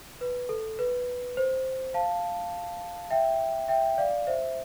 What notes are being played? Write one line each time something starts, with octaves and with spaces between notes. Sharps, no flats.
B4
A4
B4
C5
F5 A5
E5 G5
E5 G5
D5 F5
C5 E5